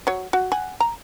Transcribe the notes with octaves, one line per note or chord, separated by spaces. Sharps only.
F#3 C#5
F#4
F#5 G#5
A#5